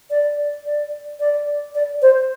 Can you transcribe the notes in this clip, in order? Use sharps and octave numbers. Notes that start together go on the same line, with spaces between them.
D5
D5
D5
D5
C5